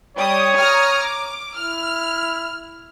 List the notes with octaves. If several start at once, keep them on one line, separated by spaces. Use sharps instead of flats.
G3 G4 C#5 D#6
A#5 D#6 F6
D6
E4 F6